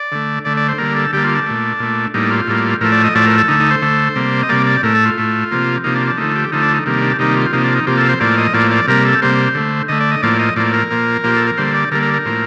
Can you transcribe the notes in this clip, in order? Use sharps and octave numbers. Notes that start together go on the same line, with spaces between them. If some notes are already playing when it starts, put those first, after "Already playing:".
Already playing: D5
D3 A3
D3 A3 D5
D5
C5
D3 G3 A#3 A#4
A4
D3 G3 A#3 G4
F4
D4
A#2 A3
A#2 A3
A2 G3 A#3 D#4
F4
A2 G3 A#3
A2 F3 A3 A#4
D5
D#5
A2 F3 A3 D5
A#4
A4
D3 A3 D#4
D#4
C5
D3 A3
C3 G3 A#3
D#5
C3 G3 A#3 D5
D5
A2 A3 A#4
A4
F4
A2 A3
C3 F3 A#3
C3 F3 A#3 D#4
D4
D4
D3 F3 A3 D#4
G4
D3 F3 A3 D#4
D4
D#4
C3 D#3 G3 A#3
D4
C3 D#3 G3 A#3 D#4
F4
C3 F3 A#3 D#4
D4
D#4
C3 F3 A#3 G4
A4
C5
A2 F3 A#3 D5
D#5
A2 F3 A#3 D5
D5
C3 G3 A#3 A#4
A4
C3 G3 A#3 C5
D3 A3
D3 A3 D#5
D5
D#5
A2 F3 A#3 D5
D#5
A2 F3 A#3 D5
A#4
A#2 F3 A#3
A#2 F3 A#3 G4
A4
A#4
D3 G3 A#3 C5
D5
D3 G3 A#3 A#4
A#4
A#4
A2 F3 A#3